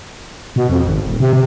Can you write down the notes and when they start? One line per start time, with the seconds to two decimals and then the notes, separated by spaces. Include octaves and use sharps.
0.56 B2
0.70 F2
0.86 G#1
1.06 D#1
1.20 C3
1.33 C3